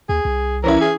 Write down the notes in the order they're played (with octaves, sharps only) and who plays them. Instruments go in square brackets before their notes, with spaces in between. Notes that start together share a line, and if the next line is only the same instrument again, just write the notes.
[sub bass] D#2 [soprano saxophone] G#4
[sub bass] C2
[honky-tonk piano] E3 C#4 E4 [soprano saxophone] A#4
[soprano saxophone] G#4